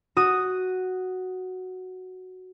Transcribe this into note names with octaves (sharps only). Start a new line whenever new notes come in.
F#4 D#6